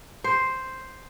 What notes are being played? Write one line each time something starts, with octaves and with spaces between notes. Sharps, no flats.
C5